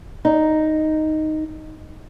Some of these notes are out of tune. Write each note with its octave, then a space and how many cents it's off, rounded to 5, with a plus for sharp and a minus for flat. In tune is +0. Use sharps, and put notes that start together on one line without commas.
D#4 +0